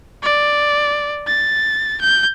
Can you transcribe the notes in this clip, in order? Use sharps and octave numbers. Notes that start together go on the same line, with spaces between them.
D5
A6
G6